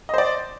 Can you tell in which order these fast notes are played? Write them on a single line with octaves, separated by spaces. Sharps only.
D#5 C5 D5